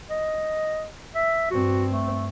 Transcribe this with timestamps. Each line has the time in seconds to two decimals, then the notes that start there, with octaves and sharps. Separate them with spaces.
0.10 D#5
1.15 E5
1.51 G2 C4 F#4
1.91 A3